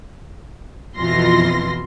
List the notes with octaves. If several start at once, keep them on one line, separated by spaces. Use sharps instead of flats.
F2 B2 E3 F4 C6 A#6